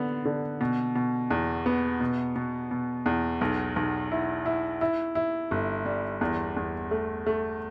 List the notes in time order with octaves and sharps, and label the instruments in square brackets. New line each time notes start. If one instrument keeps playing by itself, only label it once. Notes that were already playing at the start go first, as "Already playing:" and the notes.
Already playing: [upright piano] D3 B3
D3
B2
B2
E2
B3
B2
B2
B2
E2
B1
B1
E4
E4
E4
E4
G1
G3
E2
E2
A3
A3